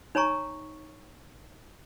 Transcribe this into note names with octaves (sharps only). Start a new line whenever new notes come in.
D#4 C#5 G#5 A#5 C#6